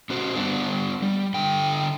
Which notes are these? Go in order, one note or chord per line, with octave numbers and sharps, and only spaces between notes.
C#4 F#4 C5
G3 B3 D4
G3
D3 G5